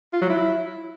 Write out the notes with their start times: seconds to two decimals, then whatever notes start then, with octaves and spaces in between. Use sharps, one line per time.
0.13 F4
0.21 F#3
0.30 E4